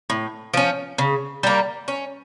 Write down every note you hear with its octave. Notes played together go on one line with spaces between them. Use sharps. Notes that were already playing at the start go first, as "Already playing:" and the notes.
A2
F3 C#4
C#3
G3 A#3
C#4